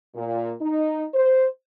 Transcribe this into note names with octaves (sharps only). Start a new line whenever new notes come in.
A#2
D#4
C5